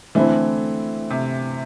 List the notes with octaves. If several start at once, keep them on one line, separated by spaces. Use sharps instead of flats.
D3 E3 A3 C4 E4
C3